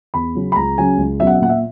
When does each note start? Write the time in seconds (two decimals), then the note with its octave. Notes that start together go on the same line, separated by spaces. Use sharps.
0.14 E2 B5
0.35 C#3 F#3 C#4
0.52 B5
0.56 C#2 A#5
0.78 C#3 F#3 C#4 G#5
0.98 C#2
1.20 B2 F#3 C#4 E5
1.27 F#5
1.35 E5
1.41 A#2 F#5
1.49 E5